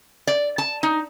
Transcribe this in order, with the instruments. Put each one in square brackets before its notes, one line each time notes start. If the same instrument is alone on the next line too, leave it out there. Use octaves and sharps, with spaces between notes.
[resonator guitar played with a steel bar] D5
A5
D#4